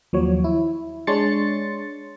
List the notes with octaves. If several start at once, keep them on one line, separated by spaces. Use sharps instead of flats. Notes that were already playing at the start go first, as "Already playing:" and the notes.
D#2 F3 F#3 C#5
E4
G#3 D4 C#5 C6 A6 C#7